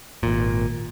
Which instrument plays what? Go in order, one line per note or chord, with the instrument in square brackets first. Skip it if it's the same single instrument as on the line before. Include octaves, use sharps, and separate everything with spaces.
[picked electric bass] G#1 A#2